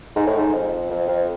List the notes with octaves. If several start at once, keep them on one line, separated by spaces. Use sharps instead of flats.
G#2
A2
G#2
F2
F2
F2